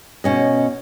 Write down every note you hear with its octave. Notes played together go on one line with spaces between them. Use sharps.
B2 C#4 D#5